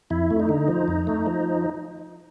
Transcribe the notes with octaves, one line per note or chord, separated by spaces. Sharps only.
F2 E4
A3
D#4
D3
F3
F2
A3
F3